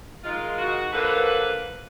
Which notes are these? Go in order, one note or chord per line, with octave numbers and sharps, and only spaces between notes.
D#3 G#3 F4
F#4
D3 F3 A#3 B4
B4